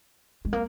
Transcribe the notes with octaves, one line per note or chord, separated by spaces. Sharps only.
G#3
A#3